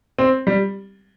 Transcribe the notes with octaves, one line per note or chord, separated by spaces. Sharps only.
C4
G3